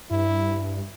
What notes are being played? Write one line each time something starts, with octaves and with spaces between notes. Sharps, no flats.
G2 E4